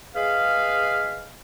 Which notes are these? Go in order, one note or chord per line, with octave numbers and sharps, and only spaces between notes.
G#3 G#4 B4 F5